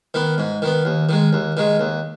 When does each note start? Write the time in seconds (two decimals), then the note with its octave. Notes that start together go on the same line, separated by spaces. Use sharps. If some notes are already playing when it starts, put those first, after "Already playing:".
0.14 D#3 B3
0.38 G#2
0.62 D#3 B3
0.85 D#2
1.09 D#3 G#3
1.33 D#2
1.57 D#3 G#3
1.80 D#2